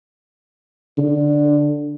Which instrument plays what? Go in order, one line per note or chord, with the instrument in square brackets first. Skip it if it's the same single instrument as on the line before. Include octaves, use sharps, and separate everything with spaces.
[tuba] D3